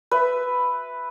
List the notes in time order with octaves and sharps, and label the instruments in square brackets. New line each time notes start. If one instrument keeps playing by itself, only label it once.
[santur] B4 E5